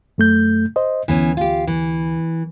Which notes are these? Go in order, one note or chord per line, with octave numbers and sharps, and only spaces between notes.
F#2 A3 G6
C5 D#5
D2 E3 B3 C#4
F4 G4
E3